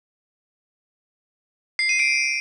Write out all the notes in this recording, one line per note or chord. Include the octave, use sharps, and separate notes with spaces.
C7
D#7
D7